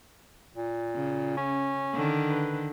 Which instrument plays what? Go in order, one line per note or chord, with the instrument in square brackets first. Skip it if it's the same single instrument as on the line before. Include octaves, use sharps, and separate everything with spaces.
[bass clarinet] A#2
[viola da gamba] C#3
[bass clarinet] C#4
[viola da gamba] D3 D#3
[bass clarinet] B4